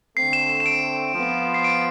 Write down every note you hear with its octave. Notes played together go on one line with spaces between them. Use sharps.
D3 A3 C4 C7
E7
E7
E7
D7
F3 B3 F4
C7
D7